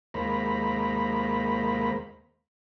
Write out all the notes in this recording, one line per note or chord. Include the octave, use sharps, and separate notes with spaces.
D#2 G#3 A#3 C5 A#5 B5